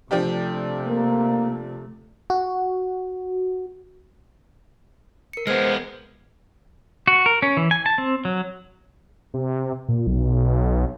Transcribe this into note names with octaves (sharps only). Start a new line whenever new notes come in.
C3 F3 A3 D4 G4
A#3
F#4
A#4 C#7
G#3 B3 C5 F6 G#6
F#4
A#4
C#4
E3
G#5
A5
C4
F#3
C3
A#2
B1